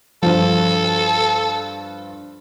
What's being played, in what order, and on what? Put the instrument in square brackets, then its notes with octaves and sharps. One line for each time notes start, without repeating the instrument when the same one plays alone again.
[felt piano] G2 F3 [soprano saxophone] A4